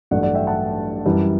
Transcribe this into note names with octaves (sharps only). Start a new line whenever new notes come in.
A1 G2 F#3 A3 D5 F#5
D5 F#5
E5 G5
F#5 A5
F#2 E3 G3